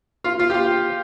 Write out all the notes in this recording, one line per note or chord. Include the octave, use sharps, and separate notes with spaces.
F4
F4
G4
F4